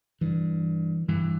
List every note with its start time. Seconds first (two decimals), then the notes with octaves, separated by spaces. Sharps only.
0.21 G2 E3
1.08 G2 E3